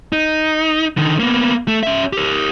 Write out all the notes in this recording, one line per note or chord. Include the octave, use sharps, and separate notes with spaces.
D#4
D3 D#3
A#3 B3
A3
C#4 E5
G4 A#4